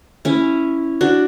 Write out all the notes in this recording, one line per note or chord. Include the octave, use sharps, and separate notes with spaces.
C#4 E4
D4 F#4